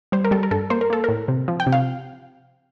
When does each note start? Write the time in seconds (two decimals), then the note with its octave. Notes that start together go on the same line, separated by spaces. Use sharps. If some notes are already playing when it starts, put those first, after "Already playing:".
0.12 G3 C5
0.24 A#4
0.31 G3 A4
0.43 A#4
0.51 G2 A4
0.70 A#3 C5
0.81 A#4
0.90 A#3 A4
1.04 A2 A#4
1.28 C3
1.48 F3
1.60 G5
1.67 C3
1.72 F5